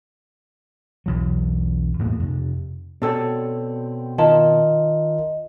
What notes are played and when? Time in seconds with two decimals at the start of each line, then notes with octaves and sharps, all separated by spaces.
1.06 B1 E2 F#3
1.99 E2 A2 A#3
2.20 F2 C3
3.02 B2 C4 D4 A4 C#5
4.18 D#3 F4 A#4 D#5 A5